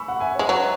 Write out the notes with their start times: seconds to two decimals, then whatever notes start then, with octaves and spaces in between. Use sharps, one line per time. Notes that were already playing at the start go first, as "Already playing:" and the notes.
Already playing: B5 C#6 E6
0.08 F#5
0.20 E5 G#5
0.35 C#5
0.39 G#3
0.49 F#3 B4